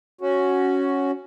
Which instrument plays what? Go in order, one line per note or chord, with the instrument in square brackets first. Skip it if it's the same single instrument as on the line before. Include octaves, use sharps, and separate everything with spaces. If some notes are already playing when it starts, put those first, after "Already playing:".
[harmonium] C#4 F#4